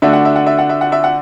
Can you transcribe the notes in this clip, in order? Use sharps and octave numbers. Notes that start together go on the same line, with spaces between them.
D3 A3 D4 F#4 E5
F#5
E5
F#5
E5
F#5
E5
F#5
E5
F#5